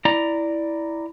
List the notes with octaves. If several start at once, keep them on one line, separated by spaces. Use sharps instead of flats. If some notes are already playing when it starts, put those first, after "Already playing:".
E4 D5 A#5